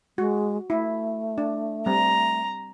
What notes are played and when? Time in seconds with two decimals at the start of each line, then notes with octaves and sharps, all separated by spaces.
0.18 G#3 F#4
0.70 A3 E4
1.38 D4
1.86 G3 C4 A#5